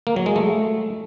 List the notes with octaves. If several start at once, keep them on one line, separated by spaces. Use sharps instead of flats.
A#3
F#3
G#3
A3